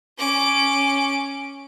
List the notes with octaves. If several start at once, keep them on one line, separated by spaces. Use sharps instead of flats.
C#4 D6